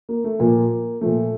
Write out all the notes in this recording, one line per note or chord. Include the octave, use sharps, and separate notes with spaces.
A#3
A3
A#2 F3 A#3
A#2 F3 A3